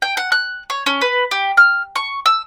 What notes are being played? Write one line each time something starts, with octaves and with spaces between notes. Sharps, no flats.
G5
F#5
F#6
C#5
C#4
B4
G4
F6
C#6
E6